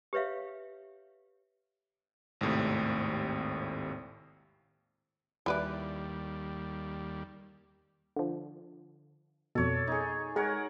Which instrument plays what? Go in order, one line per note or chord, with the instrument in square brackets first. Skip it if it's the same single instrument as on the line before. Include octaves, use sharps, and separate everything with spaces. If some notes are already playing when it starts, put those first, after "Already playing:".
[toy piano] G4 B4 C#5 E5 F5
[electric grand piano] G#1 D#2 A2 C3
[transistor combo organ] D#2 G3 [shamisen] E4 B4 D5
[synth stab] D3 F3
[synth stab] F2 B2 [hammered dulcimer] A4 C#5 D5
[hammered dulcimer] D#4 G#4
[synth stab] G#3 [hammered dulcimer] A#4 C#5 F#5